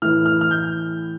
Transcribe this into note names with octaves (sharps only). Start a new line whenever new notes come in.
A2 E3 F6
F6
F6
G6